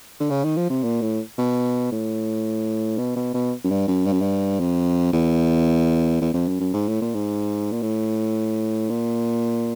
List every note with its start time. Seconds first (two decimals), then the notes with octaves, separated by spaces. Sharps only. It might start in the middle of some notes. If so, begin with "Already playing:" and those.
0.20 D3
0.30 C#3
0.44 D#3
0.57 F3
0.70 C3
0.83 A#2
1.01 A2
1.38 B2
1.92 A2
2.98 B2
3.16 B2
3.34 B2
3.64 F#2
3.71 G2
3.88 F#2
4.06 G2
4.13 F#2
4.21 G2
4.60 F2
5.13 E2
6.21 E2
6.34 F2
6.48 F#2
6.60 F#2
6.74 G#2
6.88 A2
7.02 A#2
7.14 G#2
7.72 A#2
7.82 A2
8.90 A#2